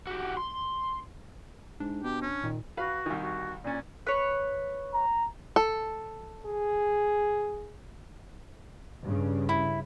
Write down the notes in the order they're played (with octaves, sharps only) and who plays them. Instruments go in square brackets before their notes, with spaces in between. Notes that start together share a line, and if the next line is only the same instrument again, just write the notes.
[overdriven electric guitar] F#4 G4
C6
[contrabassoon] G#2 [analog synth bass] D4
[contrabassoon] B2 [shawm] G4
[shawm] C#4
[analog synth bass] A#2 [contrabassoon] D#3
[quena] F#4 [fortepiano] B4 F5
[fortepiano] C2 D#3
[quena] F#4
[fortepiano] A#2 C#4 [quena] D5
[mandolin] B4 C#5
[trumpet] A#5
[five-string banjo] A4
[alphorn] G#4
[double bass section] G2 C#3
[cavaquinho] E4